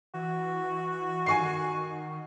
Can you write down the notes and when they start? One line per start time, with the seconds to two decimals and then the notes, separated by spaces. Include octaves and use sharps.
0.14 E3 F#4
1.26 D#3 G#5 C#6 C7